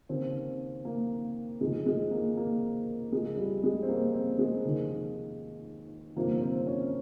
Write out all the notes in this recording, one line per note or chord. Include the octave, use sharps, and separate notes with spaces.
D#2 C#3 C4
A#3
F1 F2 C3 D#3 G#3
G#3
A#3
A#3
C#2 C#3 G#3
G3
G#3
C4
A#3
C4
G#3
F1 D#2 D#3
G1 F2 C3 D#3 A#3
C4
C#4